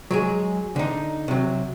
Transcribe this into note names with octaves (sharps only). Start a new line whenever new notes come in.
F#3 G#3 G#4
D3 D#4
C3 F#3